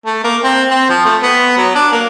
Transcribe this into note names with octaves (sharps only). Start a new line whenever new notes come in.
A3
A#3
C4
C4
F3
A3
B3
F#3
D4
A#3